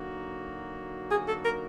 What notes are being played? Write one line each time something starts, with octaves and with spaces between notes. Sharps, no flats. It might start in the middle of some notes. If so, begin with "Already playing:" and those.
Already playing: D3 F#3 A#3 D#4 F#4
G#4
A4
A#4